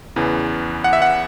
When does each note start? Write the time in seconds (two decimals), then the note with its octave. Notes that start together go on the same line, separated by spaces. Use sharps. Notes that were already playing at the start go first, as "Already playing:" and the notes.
0.16 E2 C#3 E3
0.84 F#5
0.93 E5
1.02 F#5